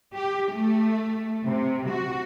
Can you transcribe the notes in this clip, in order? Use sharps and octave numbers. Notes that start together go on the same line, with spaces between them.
G4
A3
C3
F#4